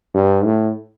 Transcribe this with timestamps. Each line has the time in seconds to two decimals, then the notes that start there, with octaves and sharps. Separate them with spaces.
0.14 G2
0.45 A2